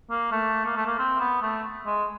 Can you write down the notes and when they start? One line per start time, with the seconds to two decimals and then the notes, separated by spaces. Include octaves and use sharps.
0.10 A#3
0.32 A3
0.65 A#3
0.76 A3
0.87 A#3
0.99 C4
1.20 B3
1.42 A3
1.86 G#3